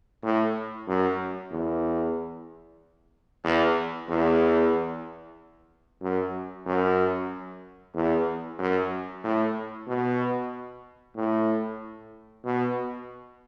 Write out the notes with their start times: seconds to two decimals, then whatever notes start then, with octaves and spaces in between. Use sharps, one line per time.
0.23 A2
0.88 F#2
1.52 E2
3.44 E2
4.09 E2
6.01 F#2
6.66 F#2
7.95 E2
8.59 F#2
9.24 A2
9.88 B2
11.16 A2
12.45 B2